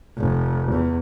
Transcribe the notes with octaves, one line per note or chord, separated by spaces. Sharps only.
F1
E2